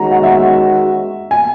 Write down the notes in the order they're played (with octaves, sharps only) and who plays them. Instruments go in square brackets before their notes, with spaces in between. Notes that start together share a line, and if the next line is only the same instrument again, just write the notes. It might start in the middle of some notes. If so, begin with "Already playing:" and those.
Already playing: [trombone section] D#3 G#3 C#4 F#4 [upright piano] A#5
[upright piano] F#5
E5
G#5